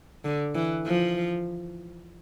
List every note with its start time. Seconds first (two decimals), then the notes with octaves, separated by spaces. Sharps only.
0.25 D3
0.55 E3
0.86 F3